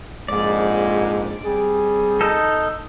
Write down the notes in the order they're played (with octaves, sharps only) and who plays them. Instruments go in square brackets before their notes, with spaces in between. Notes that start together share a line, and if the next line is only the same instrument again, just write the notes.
[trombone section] A#1 F2 G#2 [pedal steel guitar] D5
[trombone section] C3 G3 G#4
[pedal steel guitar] D#4 A4